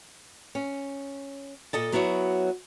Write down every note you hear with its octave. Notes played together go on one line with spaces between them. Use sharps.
C#4
A#2 A4 D#5 A5
F#3 B3 E4 F#4 C#5